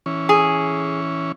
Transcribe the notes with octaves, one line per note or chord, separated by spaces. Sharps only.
E3 C#4
G#4